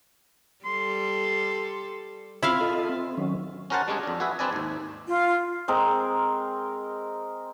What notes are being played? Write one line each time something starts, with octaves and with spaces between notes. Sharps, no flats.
G3 A4 C6
C4 E4 F4 E5 F5
F4 A4 D#5
C4
D#3 F#3 C#4
C#4 F#4 A#4 C5 F#5 A5
G3 G#3 C#4 D4 G#4
F2 D4
F#4 G#4 B4 E5
C4 D4 B4 D5 G#5
D#2 G#2
F4
G#3 C4 G#4 A#4